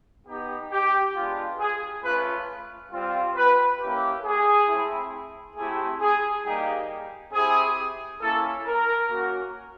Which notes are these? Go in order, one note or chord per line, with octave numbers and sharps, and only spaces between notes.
B3 D#4 G4
G4
G#3 B3 D4 F4
G#4
A3 C#4 F4 B4
G3 C4 F4
B4
A#3 C#4 E4 G4
G#4
A3 C4 E4
A3 C4 E4 G4 G#4
G#4
G3 A#3 D#4 G4 G#4
C4 E4 G4 G#4
A#3 C#4 E4 A4
A#4
A#3 C#4 F#4